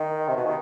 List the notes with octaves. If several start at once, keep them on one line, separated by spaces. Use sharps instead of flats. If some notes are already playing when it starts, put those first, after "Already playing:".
Already playing: D#3
C3
B2
D#3